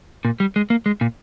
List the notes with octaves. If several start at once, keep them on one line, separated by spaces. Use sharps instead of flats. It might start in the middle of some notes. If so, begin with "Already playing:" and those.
A#2
G3
G#3
A#3
G#3
A#2